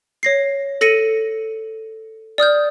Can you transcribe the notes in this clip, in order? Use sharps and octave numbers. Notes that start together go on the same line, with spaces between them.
C#5 A#6 C7
A4 A#6 C#7 D#7 F#7
D5 D#6 F6 G6